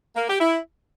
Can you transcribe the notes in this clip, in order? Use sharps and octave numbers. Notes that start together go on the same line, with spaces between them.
A#3
G4
E4